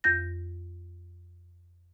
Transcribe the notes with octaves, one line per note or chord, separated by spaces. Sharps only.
F2 G6 A#6